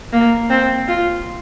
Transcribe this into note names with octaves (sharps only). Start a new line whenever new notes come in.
A#3
C4
F4